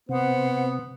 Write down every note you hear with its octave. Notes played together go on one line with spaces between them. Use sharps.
C3 B3 C5 F#5